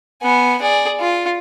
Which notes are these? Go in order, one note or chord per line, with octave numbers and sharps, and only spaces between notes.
B3 G#5
G#4 D5
F4